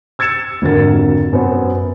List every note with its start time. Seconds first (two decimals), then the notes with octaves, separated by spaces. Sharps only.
0.19 E6 G#6 A6 C#7 E7
0.62 G#1 F2 D3 F#4 A#4 A6
1.33 F#2 B3 C5 C#5